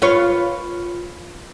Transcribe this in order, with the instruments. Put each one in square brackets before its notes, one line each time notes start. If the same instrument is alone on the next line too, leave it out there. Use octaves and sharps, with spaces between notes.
[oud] F4 B4 C#5